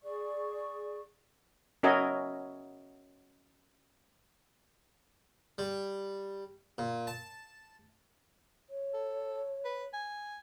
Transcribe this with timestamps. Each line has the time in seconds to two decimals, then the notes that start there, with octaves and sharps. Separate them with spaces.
0.03 G#4 D5 C#6
1.83 C#4 F#4 A#4 D#5 E5 G#5
5.58 G3
6.78 A#2
7.07 A5
8.70 C#5
8.94 A4
9.65 B4
9.93 G#5